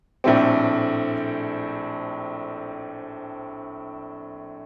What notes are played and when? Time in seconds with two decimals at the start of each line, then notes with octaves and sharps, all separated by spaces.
0.24 A#1 A2 A3 C4